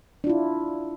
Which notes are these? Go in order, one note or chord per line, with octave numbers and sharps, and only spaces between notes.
D4 E4 F4